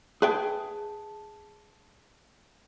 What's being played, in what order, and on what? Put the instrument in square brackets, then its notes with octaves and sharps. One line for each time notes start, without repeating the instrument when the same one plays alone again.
[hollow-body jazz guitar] G#4 A5 [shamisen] B4 E5 G5